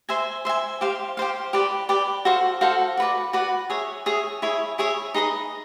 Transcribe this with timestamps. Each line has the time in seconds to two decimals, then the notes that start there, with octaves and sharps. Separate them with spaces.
0.09 C5 E5 G#5
0.45 C5 E5 G#5
0.81 G4 C5 F5
1.17 G4 C5 F5
1.53 G4 B4 D5
1.89 G4 B4 D5
2.25 F#4 A4 C5 F5
2.61 F#4 A4 C5 F5
2.97 F#4 B4 D5
3.33 F#4 B4 D5
3.70 G#4 C#5 E5
4.06 G#4 C#5 E5
4.42 E4 G#4 C#5 E5
4.78 E4 G#4 C#5 E5
5.14 D#4 G#4 B4 D#5